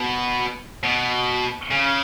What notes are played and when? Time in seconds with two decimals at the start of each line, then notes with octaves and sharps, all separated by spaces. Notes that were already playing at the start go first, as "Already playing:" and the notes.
Already playing: B2
0.84 B2
1.71 C#3